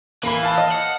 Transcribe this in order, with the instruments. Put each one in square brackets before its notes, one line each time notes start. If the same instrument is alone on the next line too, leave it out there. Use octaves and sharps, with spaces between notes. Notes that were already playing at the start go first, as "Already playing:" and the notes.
[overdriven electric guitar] E3 [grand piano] A#3 B5
[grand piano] F5 A5
[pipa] D#5
[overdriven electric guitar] F#5